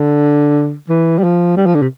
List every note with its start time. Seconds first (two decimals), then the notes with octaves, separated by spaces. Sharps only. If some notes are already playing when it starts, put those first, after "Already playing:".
Already playing: D3
0.89 E3
1.19 G3
1.24 F3
1.57 G3
1.66 F3
1.75 D3
1.82 C3